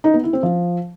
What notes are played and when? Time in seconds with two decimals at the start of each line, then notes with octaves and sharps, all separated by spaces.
0.04 D#4
0.14 B3
0.23 E4
0.33 C4
0.43 F3